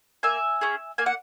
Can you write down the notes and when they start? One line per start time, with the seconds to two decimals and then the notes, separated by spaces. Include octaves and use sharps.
0.23 A#3 E5 G#5
0.61 C#4 G#4
0.98 A#3 G#5
1.06 F#5